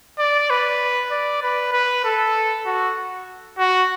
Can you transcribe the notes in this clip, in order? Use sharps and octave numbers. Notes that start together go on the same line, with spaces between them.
D5
B4
D5
B4
B4
A4
F#4
F#4